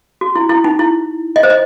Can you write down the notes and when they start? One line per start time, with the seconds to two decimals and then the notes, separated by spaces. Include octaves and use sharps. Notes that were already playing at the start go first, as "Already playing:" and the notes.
0.21 F#4
0.36 E4
0.50 E4
0.64 D#4
0.79 E4
1.36 D#5
1.43 C5
1.50 D#5